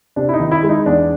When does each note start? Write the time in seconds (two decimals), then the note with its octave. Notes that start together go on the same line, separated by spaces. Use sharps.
0.16 C3 D4
0.29 E4
0.34 D#4
0.40 D#3
0.51 E4
0.63 G#3
0.69 D#4
0.86 E2 D4